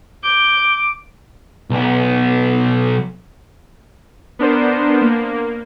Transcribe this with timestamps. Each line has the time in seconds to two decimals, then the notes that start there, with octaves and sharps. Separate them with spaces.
0.24 D6 G6
1.70 B1 B3
4.39 B3 D4 A#4 C5
5.02 A#3